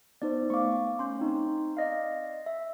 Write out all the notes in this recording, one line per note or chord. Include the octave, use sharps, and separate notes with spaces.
B3 D#4 C5 D5
A3 B3 F5 C#6 D6
C#4 C6 G6
C4 D#4
D5 D#5 F5
E5